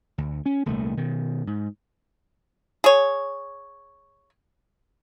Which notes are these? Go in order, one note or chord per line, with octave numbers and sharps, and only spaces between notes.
D2
C#4
D#1 C2 D#3 A3
B2 D#3
G#2
G#4 C#5